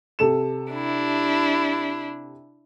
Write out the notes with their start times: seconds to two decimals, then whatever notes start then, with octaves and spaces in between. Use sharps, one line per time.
0.19 C3 A4 E7
0.71 D4 E4